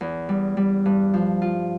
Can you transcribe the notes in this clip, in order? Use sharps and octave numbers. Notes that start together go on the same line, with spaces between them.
E2
G3
G3
G2
F3
F4